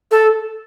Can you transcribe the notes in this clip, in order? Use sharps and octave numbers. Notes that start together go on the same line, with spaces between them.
A4